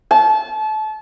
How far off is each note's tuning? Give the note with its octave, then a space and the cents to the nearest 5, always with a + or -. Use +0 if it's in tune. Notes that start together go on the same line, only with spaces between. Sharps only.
A5 -30